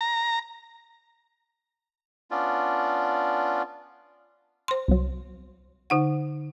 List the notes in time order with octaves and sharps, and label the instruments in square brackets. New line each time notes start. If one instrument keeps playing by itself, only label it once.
[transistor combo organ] A#5
[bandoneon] B3 C#4 D4 F4 D5
[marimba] C5 C6
[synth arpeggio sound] C2 F#3
[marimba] D3 D#4 F#5